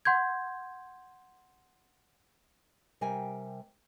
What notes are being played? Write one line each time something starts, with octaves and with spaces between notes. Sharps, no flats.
F#5 C6 G6 G#6
C3 G3 A#4 G5 G#5